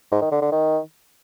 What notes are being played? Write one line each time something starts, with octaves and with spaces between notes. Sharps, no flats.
G#2
D#3
D3
D3
D#3